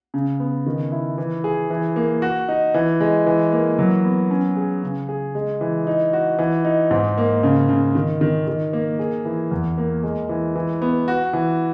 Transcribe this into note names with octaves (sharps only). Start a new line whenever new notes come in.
C#3
B3
D#3
E4
E3
G#4
E3
A#3
F#4
D#4
E3
G#3
E3
A#3
F#3
B3
C#4
G#4
C#3
G#4
G#3
E3
D#4
F#4
E3
D#4
G#2
A#3
C#3
C#3
D#3
D#3
D#3
A#3
G#4
E3
E2
A#3
G#3
E3
E3
B3
F#4
E3